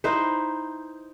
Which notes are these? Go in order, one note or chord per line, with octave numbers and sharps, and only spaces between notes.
D#4 E4 B4 C5